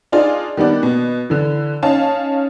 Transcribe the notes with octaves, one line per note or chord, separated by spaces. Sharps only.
D4 D#4 F4 G#4 D5
D#3 G3 B3 D4
B2
D3 E3
C#4 D#4 F5 A5